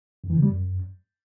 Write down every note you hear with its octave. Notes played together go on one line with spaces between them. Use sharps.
F2
E3
C#3
G3
F#2